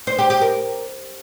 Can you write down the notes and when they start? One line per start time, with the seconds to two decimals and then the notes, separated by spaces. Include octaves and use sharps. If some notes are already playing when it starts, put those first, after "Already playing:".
0.07 C5
0.19 G4
0.30 G4
0.41 A#4